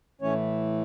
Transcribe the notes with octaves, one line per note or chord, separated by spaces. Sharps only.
A2 E3 A3 C#4 C#5